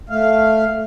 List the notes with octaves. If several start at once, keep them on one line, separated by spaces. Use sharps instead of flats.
A3 F5